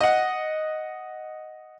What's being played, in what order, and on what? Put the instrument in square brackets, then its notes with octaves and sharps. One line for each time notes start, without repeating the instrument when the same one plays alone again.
[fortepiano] D#5 F#5